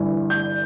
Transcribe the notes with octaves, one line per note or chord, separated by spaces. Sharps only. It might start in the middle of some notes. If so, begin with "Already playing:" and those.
Already playing: G1 G2 E3
G6